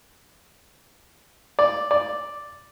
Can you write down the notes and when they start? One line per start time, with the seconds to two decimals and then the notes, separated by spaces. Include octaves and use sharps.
1.59 D5
1.91 D5